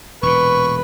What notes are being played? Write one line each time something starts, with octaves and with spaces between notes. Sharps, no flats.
E1 A#2 B4 C#6